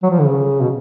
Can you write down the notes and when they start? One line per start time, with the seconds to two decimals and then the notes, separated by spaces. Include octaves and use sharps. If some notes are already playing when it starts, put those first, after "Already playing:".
0.03 F#3
0.10 F3
0.19 D3
0.26 C#3
0.61 B2